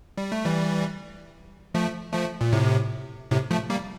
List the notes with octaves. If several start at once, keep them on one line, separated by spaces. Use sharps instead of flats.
G3
A3
E3 G3
F3 A3
F3 A3
A#2
A2 C3
A2 C3
F3 A3
G3 A#3